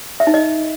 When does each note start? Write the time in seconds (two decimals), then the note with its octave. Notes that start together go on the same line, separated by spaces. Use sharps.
0.20 E5
0.27 D#4
0.34 D#5